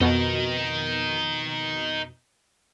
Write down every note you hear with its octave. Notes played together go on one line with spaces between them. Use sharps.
F2 B2 D#4 A#4